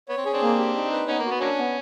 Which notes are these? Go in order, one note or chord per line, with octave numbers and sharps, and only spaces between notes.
B3 C#5
C4
C#4 G#4
C4 D4
A#3
G4
D#4
B4
B3 C#4 D#4
A#3
F#4
B3
F#3 A#3 C#4 D4
B3